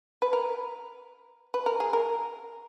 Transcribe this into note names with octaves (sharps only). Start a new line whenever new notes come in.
B4
A#4
B4
A#4
G#4
A#4